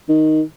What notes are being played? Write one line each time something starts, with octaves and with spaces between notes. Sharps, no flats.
D#3